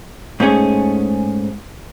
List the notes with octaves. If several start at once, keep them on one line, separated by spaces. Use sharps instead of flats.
G#2 A3 C#4 G#4